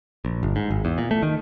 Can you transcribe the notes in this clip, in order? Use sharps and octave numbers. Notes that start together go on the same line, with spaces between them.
A#1
G1
G#2
G#1
E2
A#2
A3
D#3